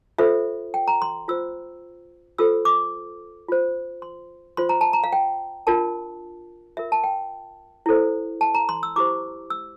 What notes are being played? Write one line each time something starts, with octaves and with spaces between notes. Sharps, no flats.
F4 A4 C5 E5
G5
A#5
C6
F4 C5 E6
F4 A4 C5 E6
D6
F4 C5
C6
F4 C5 C6
A#5
A5
A#5
F5
G5
D4 F4 A#4 A5
F4 A#4 E5
A5
G5
E4 A4 C5
A5
A#5
C6
E6
E4 G4 C5 D6
E6